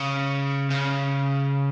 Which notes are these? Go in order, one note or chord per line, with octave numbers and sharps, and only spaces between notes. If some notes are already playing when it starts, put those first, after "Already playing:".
Already playing: C#3
C#3